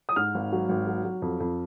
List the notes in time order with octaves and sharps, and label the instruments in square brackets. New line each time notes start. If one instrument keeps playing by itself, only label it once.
[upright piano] D#6
G#2 F6
G#1
F#3
G#1
F#3
F#3
F2
F2